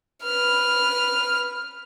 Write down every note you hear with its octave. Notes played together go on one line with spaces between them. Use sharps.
B4 F6